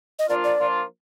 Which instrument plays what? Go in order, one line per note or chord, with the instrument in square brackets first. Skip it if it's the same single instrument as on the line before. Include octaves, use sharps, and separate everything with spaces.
[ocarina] D#5
[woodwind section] F3 A#3 D4 F4 [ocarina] D5
[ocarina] D5
[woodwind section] F3 A#3 D4 F4